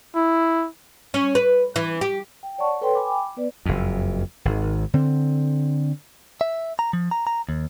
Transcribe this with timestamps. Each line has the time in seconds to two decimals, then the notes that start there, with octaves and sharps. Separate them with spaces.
0.15 E4
1.14 C#4
1.35 B4
1.76 E3
2.01 G4
2.43 G5
2.58 C#5 D5 F#5 A5 C#6
2.81 A4 B4 C#5 G5 C6
2.95 G5 G#5 B5 D6
3.37 B3 B4 D5
3.66 F#1 F2
4.45 G#1 D#3
4.94 D3 C4
6.41 E5
6.79 A#5
6.93 F3
7.11 A#5
7.27 A#5
7.49 D#2